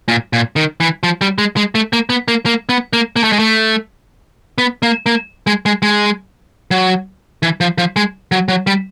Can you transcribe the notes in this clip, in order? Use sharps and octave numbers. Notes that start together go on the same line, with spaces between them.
A#2
A#2
D#3
E3
F3
G3
G#3
G#3
A3
A#3
B3
A#3
A#3
B3
A#3
A#3
A3
G#3
A3
B3
A#3
A#3
G#3
G#3
G#3
F#3
E3
F3
F3
G#3
F#3
F#3
G3